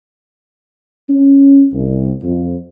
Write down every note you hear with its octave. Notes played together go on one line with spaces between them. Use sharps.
C#4
C2
F2